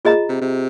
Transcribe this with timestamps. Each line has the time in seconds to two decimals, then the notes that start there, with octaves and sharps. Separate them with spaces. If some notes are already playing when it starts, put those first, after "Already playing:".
0.05 A#2 F4 G#4 D#5 A#5
0.29 C3
0.42 C3